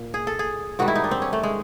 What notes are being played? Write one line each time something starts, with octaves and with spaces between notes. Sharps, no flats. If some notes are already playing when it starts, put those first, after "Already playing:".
Already playing: A#2
G#4
A4
G#4
G#2 D#3 G3 F#4
E4
D#4
D4
C4
C#4
A3
G#3